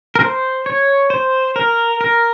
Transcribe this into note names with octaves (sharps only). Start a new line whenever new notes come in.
A#4
C5
C#5
C5
A#4
A#4